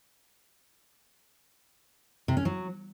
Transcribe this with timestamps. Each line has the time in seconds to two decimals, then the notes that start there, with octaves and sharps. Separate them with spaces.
2.28 C3
2.37 C#4
2.45 F#3